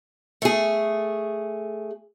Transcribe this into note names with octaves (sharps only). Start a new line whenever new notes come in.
A3 G#4